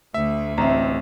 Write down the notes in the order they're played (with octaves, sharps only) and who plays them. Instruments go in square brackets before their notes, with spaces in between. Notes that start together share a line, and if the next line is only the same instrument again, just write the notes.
[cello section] D2 [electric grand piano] E5
[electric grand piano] A1 [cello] C4 [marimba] E5 A#5